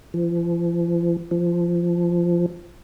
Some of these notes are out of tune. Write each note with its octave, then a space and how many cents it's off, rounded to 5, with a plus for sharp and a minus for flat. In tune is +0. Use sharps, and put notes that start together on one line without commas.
F3 -40
F3 -15